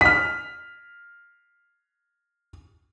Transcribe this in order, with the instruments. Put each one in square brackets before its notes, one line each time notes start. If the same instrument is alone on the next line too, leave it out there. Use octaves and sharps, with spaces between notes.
[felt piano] F6 B6